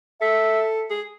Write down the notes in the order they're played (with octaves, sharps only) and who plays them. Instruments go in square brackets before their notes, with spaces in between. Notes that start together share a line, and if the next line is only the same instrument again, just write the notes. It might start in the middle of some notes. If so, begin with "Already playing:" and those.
[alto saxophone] A4 [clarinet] E5
[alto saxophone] G#4